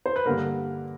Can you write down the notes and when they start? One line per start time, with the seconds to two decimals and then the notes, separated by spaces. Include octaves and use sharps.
0.06 C5
0.16 B4
0.25 G2 D3 G3 A#3 A#4